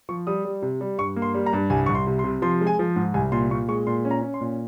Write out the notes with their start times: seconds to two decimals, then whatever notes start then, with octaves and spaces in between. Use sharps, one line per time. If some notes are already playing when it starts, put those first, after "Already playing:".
0.09 F3 C#6
0.27 G3 D#6
0.45 G3
0.62 C3
0.81 G3
0.98 G2 C#6
1.16 A#3
1.22 C6
1.34 G3
1.46 A#5
1.53 G2
1.70 C2 G#5
1.86 C2 C#6
1.95 C6
2.07 C3
2.19 C6
2.24 C3
2.42 F3 C6
2.61 G#3
2.67 G#5
2.79 F3
2.96 G#2
3.14 C2 G#5
3.32 A#2 C6
3.50 A#2 C#6
3.68 G#3 C#6
3.87 A#2 C6
4.05 C#4
4.11 A#5
4.22 C#4
4.34 C6
4.41 A#2